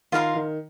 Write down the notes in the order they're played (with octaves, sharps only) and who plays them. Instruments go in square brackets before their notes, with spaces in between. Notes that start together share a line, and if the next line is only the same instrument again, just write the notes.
[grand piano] D#3 [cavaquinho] F4 A#4 F5 C6
[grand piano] D#3